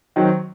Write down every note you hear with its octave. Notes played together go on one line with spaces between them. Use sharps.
D#3 F#3 C4